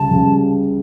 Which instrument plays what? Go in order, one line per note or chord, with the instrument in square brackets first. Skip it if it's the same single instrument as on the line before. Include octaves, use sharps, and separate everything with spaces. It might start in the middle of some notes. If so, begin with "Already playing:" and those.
Already playing: [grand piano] C#2 C#3 G3 [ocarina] A5
[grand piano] C#2 C#3 G3